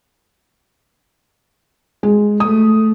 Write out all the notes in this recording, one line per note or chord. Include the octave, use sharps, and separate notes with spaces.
G#3
A3 D#6